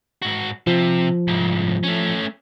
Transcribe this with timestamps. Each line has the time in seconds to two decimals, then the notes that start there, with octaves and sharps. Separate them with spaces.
0.22 G#2 F#4
0.67 C3 F3
1.28 C2 G#2
1.83 A3 C#4